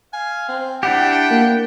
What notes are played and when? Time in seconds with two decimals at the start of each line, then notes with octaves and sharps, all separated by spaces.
0.13 F5 G#5
0.49 C4
0.83 D4 E4 G4 F#5 G5
1.31 A#3